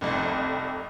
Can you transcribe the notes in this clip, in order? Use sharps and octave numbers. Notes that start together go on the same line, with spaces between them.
F1 C2 F2